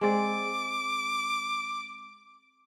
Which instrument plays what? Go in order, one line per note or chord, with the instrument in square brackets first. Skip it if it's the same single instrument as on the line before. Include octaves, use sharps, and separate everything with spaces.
[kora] G#3 C4 D5 [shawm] D6